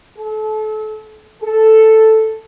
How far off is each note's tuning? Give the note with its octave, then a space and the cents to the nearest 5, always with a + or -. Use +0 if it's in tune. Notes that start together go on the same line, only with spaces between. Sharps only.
A4 -30
A4 +0